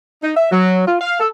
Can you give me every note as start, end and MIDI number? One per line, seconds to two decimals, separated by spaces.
0.23 0.33 63
0.35 0.50 76
0.51 0.87 54
0.87 0.97 65
1.01 1.18 77
1.20 1.27 69